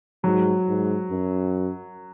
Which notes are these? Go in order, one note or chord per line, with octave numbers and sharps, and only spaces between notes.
G#2 F#3
G#2
F#2